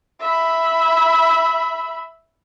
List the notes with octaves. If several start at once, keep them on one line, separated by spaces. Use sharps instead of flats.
E5 B5